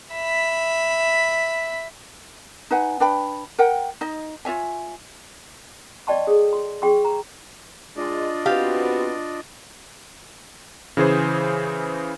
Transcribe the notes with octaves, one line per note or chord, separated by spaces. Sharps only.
E5 B5
D#4 B4 F#5 G#5
D4 B4 G5 B5
A#4 F#5 G5
D#4 D#5
F4 C#5 E5 G#5
D5 D#5 G5 A5 C6 C#6
G#4 A4
C6
G#4 G5 C6 C#6
A#5
G#3 D4 F4 D5 D#5
B3 C4 F#4 G4 F5
C#3 E3 G#4 C5